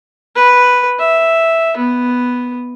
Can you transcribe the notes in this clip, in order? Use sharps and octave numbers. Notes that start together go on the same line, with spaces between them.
B4
E5
B3